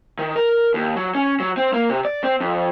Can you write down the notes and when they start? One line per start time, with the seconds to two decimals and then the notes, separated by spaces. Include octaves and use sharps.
0.19 D#3
0.36 A#4
0.74 D#2
0.96 F#3
1.15 C#4
1.40 F#3
1.57 C4
1.73 A#3
1.90 C3
2.05 D5
2.23 C4
2.41 F2